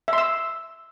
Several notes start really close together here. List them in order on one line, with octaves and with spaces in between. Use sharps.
E5 C6 E6